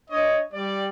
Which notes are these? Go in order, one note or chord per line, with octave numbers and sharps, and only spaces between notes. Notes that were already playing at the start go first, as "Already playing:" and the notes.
D4 C#5 D#5
G3 D5